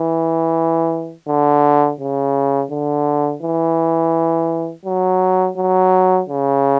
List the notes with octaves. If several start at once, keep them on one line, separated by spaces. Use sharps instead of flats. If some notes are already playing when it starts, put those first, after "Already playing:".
Already playing: E3
D3
C#3
D3
E3
F#3
F#3
C#3